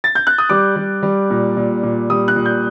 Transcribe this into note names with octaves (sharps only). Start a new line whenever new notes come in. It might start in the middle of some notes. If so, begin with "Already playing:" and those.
A6
G6
F#6
D#6
G3 D6
G3
G3
A#2
A#2
A#2
G3 D#6
F#6
A#2
G6